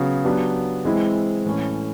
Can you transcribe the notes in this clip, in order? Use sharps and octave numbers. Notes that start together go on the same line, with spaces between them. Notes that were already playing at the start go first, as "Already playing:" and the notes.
Already playing: C#3 F#3 B3
F#3 B3 D4 G4
E3 G#3 C4 E4
A2 E3 A3 C#4